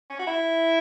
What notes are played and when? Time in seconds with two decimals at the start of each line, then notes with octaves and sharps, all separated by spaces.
0.10 C#4
0.19 F#4
0.27 E4